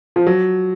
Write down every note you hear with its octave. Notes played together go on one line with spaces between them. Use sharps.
F3
F#3